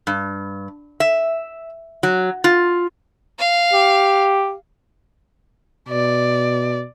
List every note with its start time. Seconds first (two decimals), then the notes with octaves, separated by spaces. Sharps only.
0.07 G2
1.00 E5
2.03 F#3
2.44 F4
3.39 F5
3.73 G4
5.89 B2 D5